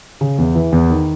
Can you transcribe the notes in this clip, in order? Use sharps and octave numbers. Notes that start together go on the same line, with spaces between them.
C#3
E2
E3
E2
D#3